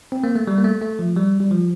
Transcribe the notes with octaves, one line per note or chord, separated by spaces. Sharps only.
C4
A#3
A3
G3
A#3
A3
A3
F3
G3
G3
F3